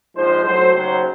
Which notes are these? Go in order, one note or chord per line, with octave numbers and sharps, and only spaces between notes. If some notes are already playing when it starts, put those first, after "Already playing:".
A#1 G#2 F3 G#3 C5
B1 A2 F#3 C5
D#2 C#3 F#3 C5